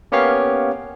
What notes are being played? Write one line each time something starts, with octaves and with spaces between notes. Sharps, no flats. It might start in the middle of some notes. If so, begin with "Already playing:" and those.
A#3 B3 C#4 G4 C#5 F5